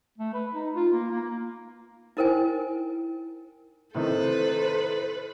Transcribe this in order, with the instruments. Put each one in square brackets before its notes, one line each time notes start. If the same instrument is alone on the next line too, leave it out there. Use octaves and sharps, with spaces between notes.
[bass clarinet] A3
B4
D#4
F4
A#3
A#3
[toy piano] D#4 E4 A#4 C5 G5 G#5
[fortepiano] A2 C3 D#3 [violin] A4 B4 [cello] C5